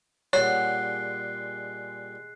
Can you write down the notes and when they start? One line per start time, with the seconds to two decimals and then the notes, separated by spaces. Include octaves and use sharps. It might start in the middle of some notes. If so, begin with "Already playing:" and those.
0.33 A#2 G3 G#3 C#5 F#5 F#6 C7